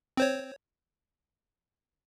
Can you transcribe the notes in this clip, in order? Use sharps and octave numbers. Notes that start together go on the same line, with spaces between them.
C4 C5 C#5